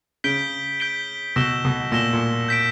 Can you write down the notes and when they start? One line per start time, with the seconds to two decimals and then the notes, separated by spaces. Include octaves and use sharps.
0.24 C#3 G6 B6 D7 G7
0.80 G6 B6 D7 G7
1.36 B2 E6 A#6 E7 G7
1.65 B2
1.92 A#2 E6 A#6 E7 G7
2.13 A#2
2.48 G6 B6 D7